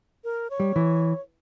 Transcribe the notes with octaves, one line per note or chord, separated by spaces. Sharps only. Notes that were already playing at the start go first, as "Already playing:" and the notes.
A#4
C#5
G3
E3